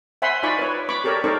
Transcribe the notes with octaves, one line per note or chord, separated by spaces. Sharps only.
C5 E5 F#5 G#5 B5 C6
D#4 F4 D5 G#5 B5 C#6
B4 C#5
B5 C#6 D6
G4 A4 A#4 C#5 D5
D#4 A4 A#4 C5 D5 C#6